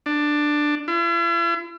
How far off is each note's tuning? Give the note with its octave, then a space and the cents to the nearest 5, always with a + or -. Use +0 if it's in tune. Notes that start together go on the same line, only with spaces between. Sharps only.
D4 +10
E4 +45